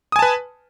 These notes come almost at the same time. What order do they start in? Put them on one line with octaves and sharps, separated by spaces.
D#6 G#5 A5 B4